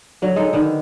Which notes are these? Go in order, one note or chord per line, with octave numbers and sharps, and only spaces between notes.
D3 F#3
G#3 D#4 A4
D3 D#3 B4